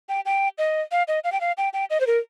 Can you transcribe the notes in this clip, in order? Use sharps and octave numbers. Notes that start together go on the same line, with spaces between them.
G5
G5
D#5
F5
D#5
F5
G5
F5
G5
G5
D#5
C5
A#4